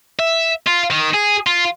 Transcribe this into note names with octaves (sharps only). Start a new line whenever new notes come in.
E5
F4
D#3
G#4
F4